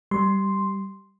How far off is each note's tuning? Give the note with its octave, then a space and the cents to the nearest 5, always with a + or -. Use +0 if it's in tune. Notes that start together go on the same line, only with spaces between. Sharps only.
G3 -5 C6 +0